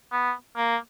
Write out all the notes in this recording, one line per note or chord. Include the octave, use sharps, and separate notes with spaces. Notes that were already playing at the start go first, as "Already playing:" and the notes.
B3
A#3